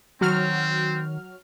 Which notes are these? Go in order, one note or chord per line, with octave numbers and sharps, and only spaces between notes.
D#3 F#3 C4 F#4 F6